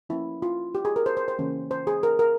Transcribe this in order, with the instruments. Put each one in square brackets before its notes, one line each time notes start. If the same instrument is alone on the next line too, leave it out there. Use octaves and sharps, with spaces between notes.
[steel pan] F3 A#3 C#4 E4
F4
G4
G#4
A#4
C5
C5
C5
C#3 E3 A#3 C#4
C5
G#4
A#4
A#4